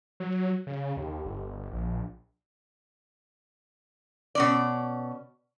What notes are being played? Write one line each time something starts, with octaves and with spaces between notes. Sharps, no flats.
F#3
C#3
D#2
G1
A#1
B2 C#4 D5